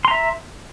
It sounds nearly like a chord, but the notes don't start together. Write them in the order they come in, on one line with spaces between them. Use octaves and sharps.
C6 A#5 E5